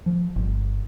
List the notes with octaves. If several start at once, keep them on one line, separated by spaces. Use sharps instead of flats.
F3
G1